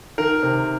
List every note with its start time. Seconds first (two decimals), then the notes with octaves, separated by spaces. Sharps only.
0.18 D#3 A#4
0.43 C3